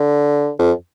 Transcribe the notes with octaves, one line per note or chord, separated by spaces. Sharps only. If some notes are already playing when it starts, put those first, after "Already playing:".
Already playing: D3
F2